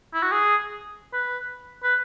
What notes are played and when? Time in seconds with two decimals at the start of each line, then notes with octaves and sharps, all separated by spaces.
0.14 E4
0.23 F#4
0.31 G#4
1.13 B4
1.83 B4